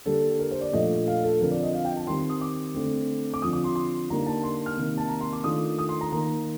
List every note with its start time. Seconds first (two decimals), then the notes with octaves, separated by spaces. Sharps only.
0.06 D3 G3 A#3 A4
0.39 A#4
0.51 C5
0.61 D5
0.73 A#2 F3 A3 D4 D#5
1.07 F5
1.24 A4
1.40 D3 F3 C4 A#4
1.51 D5
1.63 D#5
1.74 F5
1.85 G5
1.97 A5
2.07 D#3 G3 C4 C6
2.29 D#6
2.41 D6
2.75 D3 A3 C4
3.34 D6
3.42 D3 F3 C4 F4 D#6
3.53 D6
3.64 C6
3.76 C6
4.10 D3 G3 A#3 D#4 A#5
4.26 A5
4.43 C6
4.66 F6
4.77 C3 D#3 A#3 D#4
4.98 A5
5.09 A#5
5.21 C6
5.33 D6
5.44 D#3 A3 D4 F4 D#6
5.79 D#6
5.89 C6
6.01 A#5
6.12 D#3 A#3 D#4 A#5